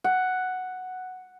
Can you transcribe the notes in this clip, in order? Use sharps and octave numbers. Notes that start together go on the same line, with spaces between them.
F#5